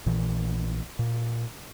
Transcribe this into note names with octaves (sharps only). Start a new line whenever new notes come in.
A#1 A#2 E3
A#2